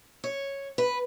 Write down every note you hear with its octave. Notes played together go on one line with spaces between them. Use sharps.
C#5
B4